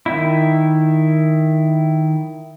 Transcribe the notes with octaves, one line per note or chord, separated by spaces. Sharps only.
D#3 E4